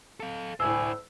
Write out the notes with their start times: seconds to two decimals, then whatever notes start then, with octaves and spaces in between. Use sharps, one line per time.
0.20 A4 F5
0.60 D2 A2 C5 D5 G#5 E6